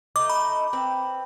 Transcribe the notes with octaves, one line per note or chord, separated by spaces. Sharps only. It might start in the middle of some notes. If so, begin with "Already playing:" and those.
A3 D#4 D6
B5
C4 B4